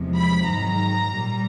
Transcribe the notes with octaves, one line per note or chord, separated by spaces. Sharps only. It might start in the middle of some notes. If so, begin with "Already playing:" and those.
Already playing: E2 C3 F3 G#3
B5
G#2 D#3 F#3 A#5
A#2 G3